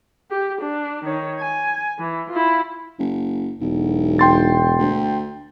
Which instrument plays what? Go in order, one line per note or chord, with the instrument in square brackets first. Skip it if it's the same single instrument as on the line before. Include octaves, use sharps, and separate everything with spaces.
[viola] G4
D4
D#3 C#5
G#5
E3
E4 F4
[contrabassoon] F#1
[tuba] E1 [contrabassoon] B1
[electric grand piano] G5 C6 A6
[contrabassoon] D2